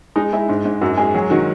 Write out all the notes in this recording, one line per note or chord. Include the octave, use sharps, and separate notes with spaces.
G#3 D#4
G#3 E4
G#2
G#2
F#2 F#4
G#3 G#4
F#3 G#4
D#3 F#4